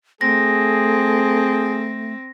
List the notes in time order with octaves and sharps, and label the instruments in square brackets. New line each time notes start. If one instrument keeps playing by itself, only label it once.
[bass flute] A3 [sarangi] C4 [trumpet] G#4 [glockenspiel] A#6